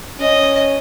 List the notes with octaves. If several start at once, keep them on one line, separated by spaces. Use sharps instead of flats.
C#4 D#5